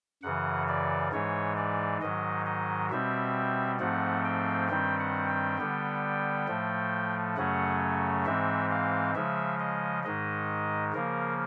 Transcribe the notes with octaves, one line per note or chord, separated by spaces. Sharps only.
F#2 C#3 E3 F#5
D5
G#2 E3 G#3 C#5
D5
G#2 D#3 F#3 D#5
D#5
B2 G3 C4 E5
G#2 F3 A3 C4 F#5
G5
G2 D#3 G3 C4 G5
F#5
G5
D3 G3 B3
A2 F3 A3
F#2 C#3 F#3 A3 C#4 F#5
G#2 E3 G#3 C4 E5
F5
C#3 F3 G#3 E5
D#5
G#2 D#3 G#3 D#5
C#3 F3 A#3 A#4